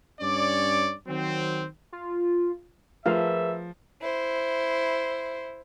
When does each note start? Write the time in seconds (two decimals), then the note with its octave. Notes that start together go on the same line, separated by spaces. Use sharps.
0.20 G2 C#4 C#5 D5
1.07 D#3 F#3 C4
1.92 F4
3.06 F3 A3 F4 G#4 A#4 B4 E5 F5
4.01 E4 C5